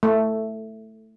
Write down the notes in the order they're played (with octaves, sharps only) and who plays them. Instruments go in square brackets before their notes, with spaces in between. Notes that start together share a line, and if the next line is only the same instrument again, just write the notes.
[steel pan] A3